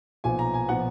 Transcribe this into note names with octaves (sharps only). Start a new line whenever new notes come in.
B1 A#2 F3 B3 G#5
A#5
G#5
A#2 F3 B3 F#5